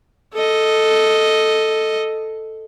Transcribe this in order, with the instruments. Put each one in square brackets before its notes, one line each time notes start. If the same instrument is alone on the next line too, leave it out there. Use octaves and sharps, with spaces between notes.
[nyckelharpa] A4 D#5